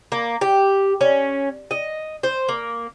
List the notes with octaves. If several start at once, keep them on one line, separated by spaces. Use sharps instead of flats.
A#3
G4
C#4
D#5
C5
A#3